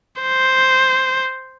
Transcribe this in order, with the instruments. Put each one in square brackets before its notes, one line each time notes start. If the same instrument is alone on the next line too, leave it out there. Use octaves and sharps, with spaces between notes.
[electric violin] C5